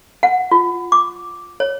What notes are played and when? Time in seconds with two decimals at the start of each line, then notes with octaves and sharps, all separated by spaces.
0.23 F#5
0.51 F4
0.92 D6
1.60 C#5